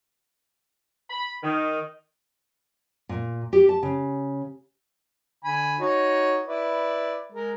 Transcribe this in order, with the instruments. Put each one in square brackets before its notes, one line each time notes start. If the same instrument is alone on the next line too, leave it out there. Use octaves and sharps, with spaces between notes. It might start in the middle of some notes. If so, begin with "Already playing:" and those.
[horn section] B5
D#3
[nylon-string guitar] A#2
G4
A5
C#3
[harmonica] D3 G#5 B5
D#4 F#4 C#5
E4 B4 D5
G#3 A#4